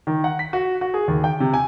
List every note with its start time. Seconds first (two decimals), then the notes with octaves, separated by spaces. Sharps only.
0.07 D#3
0.24 F#5
0.39 B6
0.53 F#4
0.81 F#4
0.94 G#4
1.08 D#2
1.24 G5
1.40 C3
1.54 G#5